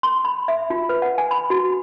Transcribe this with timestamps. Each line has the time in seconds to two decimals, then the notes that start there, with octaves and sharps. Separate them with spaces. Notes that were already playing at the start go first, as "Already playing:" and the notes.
0.03 C6
0.25 B5
0.48 E5
0.70 F4
0.89 B4
1.02 F#5
1.18 G#5
1.31 B5
1.50 F#4